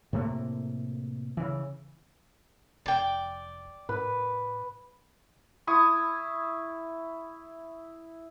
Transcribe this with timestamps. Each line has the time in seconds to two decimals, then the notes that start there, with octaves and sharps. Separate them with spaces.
0.13 A2 C3 A3 A#3
1.37 C#3 E3
2.86 F1 D5 G5
3.89 A2 B4
5.67 E4 C#6 D#6